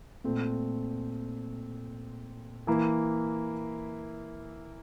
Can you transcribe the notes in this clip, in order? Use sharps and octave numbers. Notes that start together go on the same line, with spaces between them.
A#2 A3 C4
E3 A#3 E4